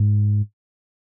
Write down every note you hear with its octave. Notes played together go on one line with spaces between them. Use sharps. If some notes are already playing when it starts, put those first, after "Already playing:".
Already playing: G#2